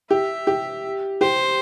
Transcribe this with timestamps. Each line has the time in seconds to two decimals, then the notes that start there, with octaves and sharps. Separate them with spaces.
0.11 G4 E5
0.47 G4
1.21 G4 C5